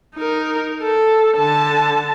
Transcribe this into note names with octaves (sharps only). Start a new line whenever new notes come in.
D#4 A#4
A4
D3 A5